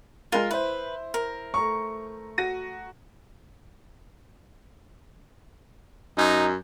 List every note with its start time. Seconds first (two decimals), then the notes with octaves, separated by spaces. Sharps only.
0.32 G#3 F4 A#4 D#7
0.51 E4 B4 C5
1.14 A#4
1.54 A3 A#5 C#6
2.38 F#4 A#6 D#7
6.18 F#2 D#4